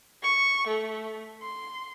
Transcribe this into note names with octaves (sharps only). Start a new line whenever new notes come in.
C#6
A3
C6